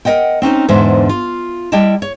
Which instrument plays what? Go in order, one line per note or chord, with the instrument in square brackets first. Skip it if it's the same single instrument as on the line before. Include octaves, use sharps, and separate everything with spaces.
[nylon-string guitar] A#4 C5 D#5 F#5 G5
C4 C#4 D#4 C5
E2 G#2 D3 C5 E5
F4
G3 E4 G4 D#5 G5 A5
C#5